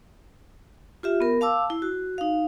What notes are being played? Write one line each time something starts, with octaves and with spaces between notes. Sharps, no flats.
F4 G4 E5
B3 A#4
F5 A5 D6 E6
E4
F#4
D#4 F5